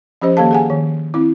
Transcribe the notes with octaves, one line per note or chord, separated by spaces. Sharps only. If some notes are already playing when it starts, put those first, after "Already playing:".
F3 C#4 G4 C5 D#5
D#3 A#3 G4 A4 F5 A5
G#4 F#5 G#5
D#3
C4 E4